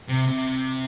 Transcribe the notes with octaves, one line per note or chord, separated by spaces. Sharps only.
C3
C3